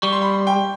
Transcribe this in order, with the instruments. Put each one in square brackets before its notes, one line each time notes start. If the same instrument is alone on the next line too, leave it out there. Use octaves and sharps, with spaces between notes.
[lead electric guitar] G3 [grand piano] C#6
[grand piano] C6
B5
C6
G5